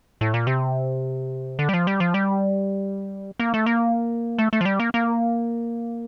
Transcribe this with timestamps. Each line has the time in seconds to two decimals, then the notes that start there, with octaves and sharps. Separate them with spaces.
0.21 A2
0.34 A#2
0.47 C3
1.59 D3
1.69 G3
1.73 F3
1.87 G3
2.00 F3
2.14 G3
3.39 A#3
3.54 A3
3.66 A#3
4.38 A3
4.53 A3
4.61 F3
4.65 G3
4.80 A#3
4.94 A#3